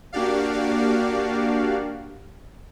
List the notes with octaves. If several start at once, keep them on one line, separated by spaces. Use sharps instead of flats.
A#3 D4 F#4 G4 D5 F5